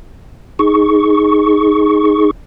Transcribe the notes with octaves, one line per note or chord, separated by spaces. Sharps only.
D#4 G#4 C#6